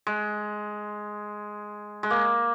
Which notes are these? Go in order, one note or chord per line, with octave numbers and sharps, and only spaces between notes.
G#3
G#3
A#3